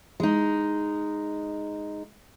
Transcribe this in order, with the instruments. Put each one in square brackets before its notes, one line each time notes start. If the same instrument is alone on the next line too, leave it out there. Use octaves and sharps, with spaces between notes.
[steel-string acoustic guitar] G#3 D#4